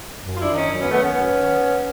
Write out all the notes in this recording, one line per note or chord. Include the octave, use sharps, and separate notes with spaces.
F#2
F4
D4 E4
D#3
C#4 D#4
F#2
B3 C#4
D#3 A3 B3
B3 C#4
F#2
D#3